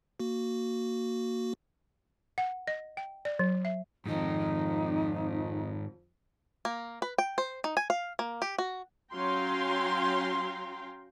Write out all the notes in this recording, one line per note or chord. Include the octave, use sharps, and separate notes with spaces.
A#3 F#4
F#5
D#5
G5
D5
F#3
E5
F2 G#2 D#3 F3 D#4
A#3
B4
G5
C5
D#4
G#5
F5
A#3
G4
F#4
F#3 C#4 F5 G5 A#5 C6